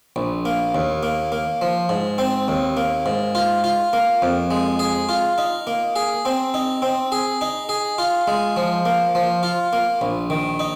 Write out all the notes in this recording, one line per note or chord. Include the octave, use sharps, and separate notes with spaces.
A#1
A#3
D#2
A#3
A#3
F3
G#2
C4
D#2
A#3
G#2
F4
F4
A#3
F2
G#3
G#4
F4
D#4
A#3
G#4
C4
D#4
C4
G#4
D#4
G#4
F4
G#3
F3
A#3
F3
F4
A#3
A#1
D#3
D#4